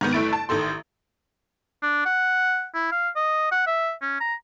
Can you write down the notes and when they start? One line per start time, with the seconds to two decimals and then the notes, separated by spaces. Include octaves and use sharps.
0.01 G#2 D#3 B3
0.13 G1 A3 E4 A6 D7
0.33 A5
0.49 A1 D#3 A4 C6
1.82 D4
2.05 F#5
2.75 E4
2.92 F5
3.16 D#5
3.51 F#5
3.67 E5
4.02 C#4
4.21 A#5